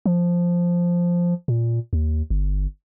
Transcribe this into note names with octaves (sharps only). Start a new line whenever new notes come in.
F3
A#2
D#2
G1